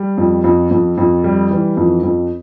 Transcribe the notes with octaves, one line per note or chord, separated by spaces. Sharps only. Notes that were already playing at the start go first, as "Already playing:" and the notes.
Already playing: G3
F2
F2
F2
F2
G3
E3
F2
F2